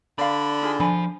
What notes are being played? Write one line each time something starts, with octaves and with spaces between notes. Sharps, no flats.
D3 D5 F5 B5
D#4 F4 G#4
F3 D4 G#5 B5